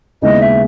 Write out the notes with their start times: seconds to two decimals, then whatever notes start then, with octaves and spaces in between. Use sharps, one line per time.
0.22 D#2 C#3 G#3 B3 E4 D#5
0.41 E5